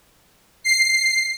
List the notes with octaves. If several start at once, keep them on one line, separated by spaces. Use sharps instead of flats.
C7